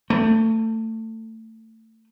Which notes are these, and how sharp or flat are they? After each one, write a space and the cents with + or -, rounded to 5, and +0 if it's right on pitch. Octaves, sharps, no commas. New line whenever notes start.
A3 +25